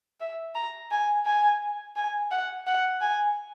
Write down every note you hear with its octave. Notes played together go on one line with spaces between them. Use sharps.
E5
A#5
G#5
G#5
G#5
F#5
F#5
G#5